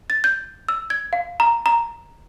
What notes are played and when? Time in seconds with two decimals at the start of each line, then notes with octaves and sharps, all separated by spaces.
0.10 A6
0.24 G6
0.69 E6
0.90 G#6
1.13 F5
1.40 A#5
1.66 A#5